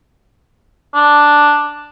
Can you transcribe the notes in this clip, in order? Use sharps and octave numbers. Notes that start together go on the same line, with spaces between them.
D4